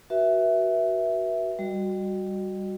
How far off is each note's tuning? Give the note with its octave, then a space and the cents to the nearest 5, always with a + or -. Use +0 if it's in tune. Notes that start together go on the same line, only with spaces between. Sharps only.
F#4 +15 B4 -40 E5 +0
G3 +0 F#4 +0 D#5 -35